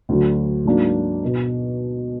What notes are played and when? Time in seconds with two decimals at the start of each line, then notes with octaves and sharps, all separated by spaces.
0.09 D2 D3 F#3
0.65 G#2 F#3 A#3 D4
1.25 B2